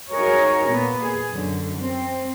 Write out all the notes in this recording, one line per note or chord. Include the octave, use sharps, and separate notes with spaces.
D#4 F#4 G#4 A#4 C#5
A#2 B3
G#4
F#2 D3
C4